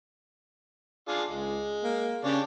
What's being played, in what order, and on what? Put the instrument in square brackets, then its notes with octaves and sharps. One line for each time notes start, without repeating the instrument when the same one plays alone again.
[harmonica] D4 F4 G#4
[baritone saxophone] C#2 [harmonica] G#3
[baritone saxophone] A#3
[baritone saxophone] C#3 [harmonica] D4 G4 C#5